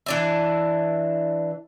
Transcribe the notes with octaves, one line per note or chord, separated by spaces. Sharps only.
E3 D4 E4